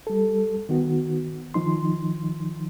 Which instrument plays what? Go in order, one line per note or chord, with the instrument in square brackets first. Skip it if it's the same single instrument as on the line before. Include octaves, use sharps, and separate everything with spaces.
[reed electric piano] G3 A4
D#3 B3 F#4
D#3 F3 D#4 C6